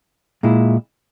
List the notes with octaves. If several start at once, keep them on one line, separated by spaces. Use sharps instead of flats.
A#2 G#3 E4